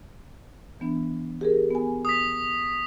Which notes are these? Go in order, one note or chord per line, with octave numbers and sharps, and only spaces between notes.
E3 B3 D4
G4 G#4 A#4
B3 G#5
D#6 B6